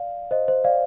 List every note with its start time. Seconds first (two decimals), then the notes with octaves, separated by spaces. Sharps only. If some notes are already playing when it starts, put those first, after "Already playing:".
Already playing: D5 F5
0.31 C5 D#5
0.48 C5
0.64 D5 F5